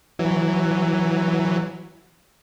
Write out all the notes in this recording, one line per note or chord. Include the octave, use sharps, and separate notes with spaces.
E3 F#3